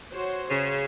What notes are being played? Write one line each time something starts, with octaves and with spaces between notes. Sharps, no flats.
F#4 C5 C#5
C#3